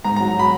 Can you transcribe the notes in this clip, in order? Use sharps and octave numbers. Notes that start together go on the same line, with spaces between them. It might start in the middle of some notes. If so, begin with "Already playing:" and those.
G#2 A#5
F#3 A#5
B5